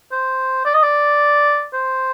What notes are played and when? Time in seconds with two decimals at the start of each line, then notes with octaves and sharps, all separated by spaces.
0.12 C5
0.65 D5
0.74 D#5
0.82 D5
1.73 C5